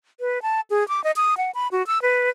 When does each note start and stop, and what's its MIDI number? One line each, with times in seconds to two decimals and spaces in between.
0.20 0.42 71
0.42 0.61 81
0.70 0.87 68
0.88 1.03 86
1.04 1.11 75
1.16 1.37 87
1.37 1.51 78
1.55 1.68 83
1.72 1.85 66
1.87 2.01 88
2.02 2.30 71